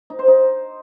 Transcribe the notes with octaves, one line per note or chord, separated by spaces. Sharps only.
D#4
C5
D#4